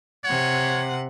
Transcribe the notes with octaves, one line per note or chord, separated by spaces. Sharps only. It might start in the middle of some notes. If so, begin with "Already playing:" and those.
C3 C#5 F#5